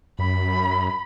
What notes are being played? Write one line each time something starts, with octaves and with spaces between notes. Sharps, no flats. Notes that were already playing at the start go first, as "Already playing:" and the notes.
F#2 B5